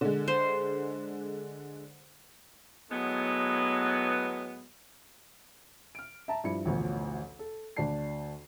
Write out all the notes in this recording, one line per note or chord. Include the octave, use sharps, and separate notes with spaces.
D3 G#3
C5
A2 F#3 G#3 B3
F6 D7
E5 A5 A#5
G2 F3 E4 C#7
A1 D2 B2 F3
A4
D2 D4 D5 A5 C7